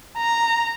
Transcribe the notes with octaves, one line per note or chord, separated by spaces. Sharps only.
A#5